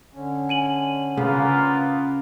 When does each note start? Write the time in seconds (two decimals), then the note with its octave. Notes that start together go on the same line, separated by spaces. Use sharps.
0.14 D3 C#4
0.49 G#5 D#7 F#7
1.17 C#3 A#3 B3 F4